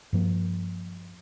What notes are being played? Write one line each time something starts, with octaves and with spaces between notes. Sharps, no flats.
G2 F3 A#3